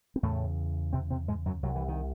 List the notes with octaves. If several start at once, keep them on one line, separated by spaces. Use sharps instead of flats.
C4
E2 A2 C#3 A3
C3 C4
C3 C4
G#2 G#3
F#2 F#3
C2 C3 F#3
E3
D#3